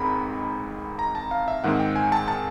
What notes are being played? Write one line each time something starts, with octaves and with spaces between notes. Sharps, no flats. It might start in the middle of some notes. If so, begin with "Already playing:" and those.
Already playing: A1 G#2 D#3 G#3 C4 A#5 B5
A#5
A5
F5
E5
G#2 D#3 G#3 C4 F#5
G5
G#5
A5
A5